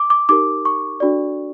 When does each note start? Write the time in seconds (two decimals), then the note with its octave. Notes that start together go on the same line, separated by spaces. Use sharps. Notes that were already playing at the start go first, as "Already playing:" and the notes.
Already playing: D6
0.10 D6
0.29 D#4 G4 A#4 D6
0.65 C#6
1.00 D4 F#4 A4 D5